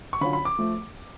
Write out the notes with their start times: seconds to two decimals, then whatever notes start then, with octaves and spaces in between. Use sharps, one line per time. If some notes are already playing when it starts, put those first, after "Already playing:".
0.13 C#6
0.21 D3 F#3 C#4 F4 B5
0.33 B5
0.45 D6
0.59 F3 A3